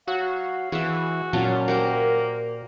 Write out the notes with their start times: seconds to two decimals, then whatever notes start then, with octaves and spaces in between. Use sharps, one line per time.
0.08 F#3 F#4 F5
0.72 E3 F#4 G#4 E5
1.33 A#2 F#3 C#4 F4 A5
1.68 A#3 F#4 G4 A#4 C5